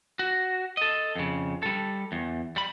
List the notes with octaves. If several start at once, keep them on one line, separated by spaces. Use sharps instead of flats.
F#4
A4 D#5
F2 C#3
G3 A4
E2
G3 B5